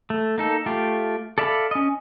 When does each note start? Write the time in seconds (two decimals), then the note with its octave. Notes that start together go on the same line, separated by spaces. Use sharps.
0.10 A3
0.38 A#3 D#4 A4
0.66 A3 F4 G4
1.38 A4 D5 E5 F5 B5
1.71 C#4 D#5